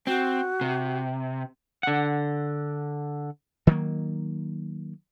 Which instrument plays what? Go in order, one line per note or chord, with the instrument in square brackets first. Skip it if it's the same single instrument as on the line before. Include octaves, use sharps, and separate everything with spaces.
[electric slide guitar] C4 [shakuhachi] F#4
[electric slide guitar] C3
[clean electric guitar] D3 F#5
[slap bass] D#3 F#3 G3 A#3